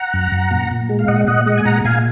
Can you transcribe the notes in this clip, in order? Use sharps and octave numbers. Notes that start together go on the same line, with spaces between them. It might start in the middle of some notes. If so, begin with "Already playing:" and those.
Already playing: F#5 A#5
F#2
F#2
A#2
A#2
G#3
F5
A#2 D#5 F#5
A#2 D#5 F#5
G#3 D#5 F#5
G#5
A#2 F#5 A#5
A#2 F5 G#5